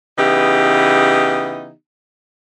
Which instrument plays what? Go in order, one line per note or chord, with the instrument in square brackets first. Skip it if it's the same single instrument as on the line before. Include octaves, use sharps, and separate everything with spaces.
[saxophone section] C#3 E3 B3 D#4 G4